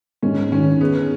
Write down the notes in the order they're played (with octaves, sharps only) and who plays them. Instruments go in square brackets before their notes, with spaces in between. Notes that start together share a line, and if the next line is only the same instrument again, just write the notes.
[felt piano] G#2 [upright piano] C#4
[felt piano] D#3 [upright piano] C#4
[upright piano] B3 [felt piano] G#4